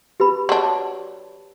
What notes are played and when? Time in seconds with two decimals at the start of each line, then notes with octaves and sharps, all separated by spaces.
0.20 G4 B4 B5
0.49 F#3 D4